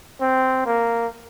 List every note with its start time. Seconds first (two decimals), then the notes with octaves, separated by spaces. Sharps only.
0.21 C4
0.66 A#3